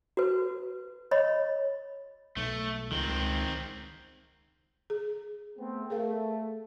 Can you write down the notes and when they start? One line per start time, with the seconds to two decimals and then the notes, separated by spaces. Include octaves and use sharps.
0.17 F#4 B4
1.11 C#5 D#5 B5
2.37 B1 A3
2.92 C#2 D#3 C4
4.90 G#4
5.58 A3 B3 C4
5.90 A3 G#4 A#4 F5